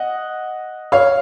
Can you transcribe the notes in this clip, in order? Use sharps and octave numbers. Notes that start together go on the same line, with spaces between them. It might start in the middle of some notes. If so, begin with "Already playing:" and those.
Already playing: D#5 F#5
C#5 F5